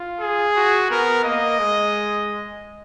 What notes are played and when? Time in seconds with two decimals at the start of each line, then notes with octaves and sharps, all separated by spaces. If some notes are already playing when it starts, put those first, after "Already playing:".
Already playing: F4
0.21 G#4
0.56 F#4
0.90 B3 A#4
1.24 A#3 D#5
1.59 G#3